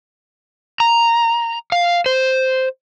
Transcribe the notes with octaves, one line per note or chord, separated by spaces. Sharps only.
A#5
F5
C5